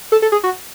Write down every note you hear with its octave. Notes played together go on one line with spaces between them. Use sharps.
A4
A4
G#4
F#4